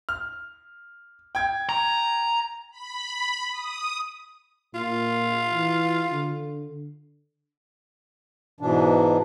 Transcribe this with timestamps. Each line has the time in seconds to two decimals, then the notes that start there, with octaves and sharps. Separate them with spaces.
0.09 F6
1.35 G5 G#6
1.69 A#5
2.71 B5
3.51 D#6
4.74 A#2 F4
5.53 E3
6.12 D3
8.61 G#2 B2 E3 D4